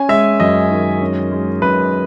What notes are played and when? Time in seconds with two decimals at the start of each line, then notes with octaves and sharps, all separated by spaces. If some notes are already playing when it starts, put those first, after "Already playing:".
Already playing: C#4 G#5
0.09 G#3 E5
0.40 F#2 D#5
0.70 D#3
1.01 C#4
1.32 G#3
1.62 F#2 B4